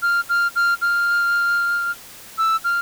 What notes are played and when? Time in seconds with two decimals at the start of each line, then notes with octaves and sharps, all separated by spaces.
0.02 F6
0.29 F6
0.56 F6
0.82 F6
2.38 E6
2.64 F6